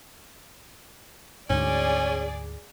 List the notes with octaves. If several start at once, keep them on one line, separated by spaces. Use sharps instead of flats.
D2 G#2 C#4 G#4 D5